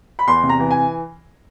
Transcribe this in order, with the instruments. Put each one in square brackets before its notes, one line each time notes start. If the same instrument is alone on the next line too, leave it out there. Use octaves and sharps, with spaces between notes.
[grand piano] B5
E2 C6
C3
A#5
E3
G#5